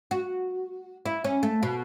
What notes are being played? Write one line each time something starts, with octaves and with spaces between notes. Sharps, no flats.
F#4
E4
C#4
A3
B2